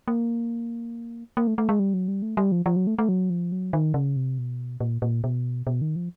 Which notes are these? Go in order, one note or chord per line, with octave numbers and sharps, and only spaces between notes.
A#3
A#3
A3
A3
G#3
G3
F#3
G3
A3
G3
F3
F3
F#3
A3
A3
F#3
F3
F#3
D#3
C#3
C3
B2
A#2
A#2
B2
B2
D#3
F3